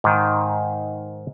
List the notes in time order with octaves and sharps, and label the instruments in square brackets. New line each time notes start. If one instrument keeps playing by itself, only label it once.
[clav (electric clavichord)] G#2 D#3